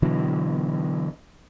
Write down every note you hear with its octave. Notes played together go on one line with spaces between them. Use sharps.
B2 D3 E3 F#3